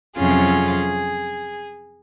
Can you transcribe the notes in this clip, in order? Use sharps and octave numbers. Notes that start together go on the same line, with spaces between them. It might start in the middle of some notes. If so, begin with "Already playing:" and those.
F2 C3 F#3 C#4 F4 G#4